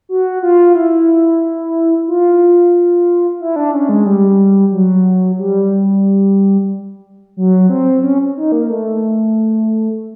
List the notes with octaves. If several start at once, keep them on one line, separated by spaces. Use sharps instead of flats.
F#4
F4
E4
F4
E4
D4
C#4
G#3
G3
F#3
G3
F#3
C4
C#4
D#4
A#3
A3